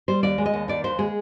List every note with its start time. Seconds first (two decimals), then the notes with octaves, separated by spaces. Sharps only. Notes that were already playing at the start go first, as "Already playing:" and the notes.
0.08 G3 C5
0.23 D#2 D5
0.38 G#3
0.46 D#5
0.54 D#2
0.68 D#3 D5
0.84 D#2 C5
0.99 G#3 G#4